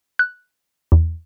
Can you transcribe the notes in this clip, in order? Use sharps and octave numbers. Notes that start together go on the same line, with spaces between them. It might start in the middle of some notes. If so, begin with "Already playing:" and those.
F#6
E2